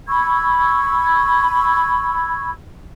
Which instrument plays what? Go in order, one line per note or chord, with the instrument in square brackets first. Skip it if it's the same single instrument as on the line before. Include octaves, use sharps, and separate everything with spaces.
[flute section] B5 C#6 E6 G#6